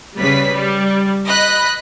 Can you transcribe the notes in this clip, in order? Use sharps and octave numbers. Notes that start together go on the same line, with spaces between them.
C#3 G3 B4 B6
G3
D#5 B5 F#6